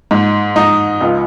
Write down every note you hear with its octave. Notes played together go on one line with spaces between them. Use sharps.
G#2
G#2 D#4
C#2 F4